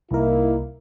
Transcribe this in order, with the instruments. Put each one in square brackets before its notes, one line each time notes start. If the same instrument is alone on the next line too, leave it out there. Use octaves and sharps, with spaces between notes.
[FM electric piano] C2 A#4 [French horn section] A#3 D#4 E4